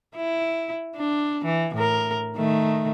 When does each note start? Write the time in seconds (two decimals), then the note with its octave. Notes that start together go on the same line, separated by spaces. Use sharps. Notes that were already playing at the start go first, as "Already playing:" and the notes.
0.16 E4
0.96 D4
1.45 E3
1.75 A2 A#4
2.37 D#3 A3